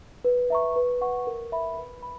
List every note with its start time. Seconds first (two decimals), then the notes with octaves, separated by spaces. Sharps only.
0.25 B4
0.50 E5 A#5 C#6
0.76 B4
1.01 F#5 C#6
1.27 A#4
1.52 E5 B5
1.78 B4
2.03 B5